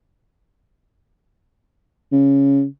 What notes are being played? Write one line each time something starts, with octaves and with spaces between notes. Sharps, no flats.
C#3